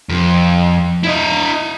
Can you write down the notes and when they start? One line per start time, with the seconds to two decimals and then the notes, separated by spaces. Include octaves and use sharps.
0.09 F2
1.04 E4 D#5